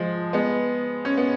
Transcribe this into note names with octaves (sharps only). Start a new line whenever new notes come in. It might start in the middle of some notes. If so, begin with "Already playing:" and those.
Already playing: F3 G#3
G#3 B3
C#4
B3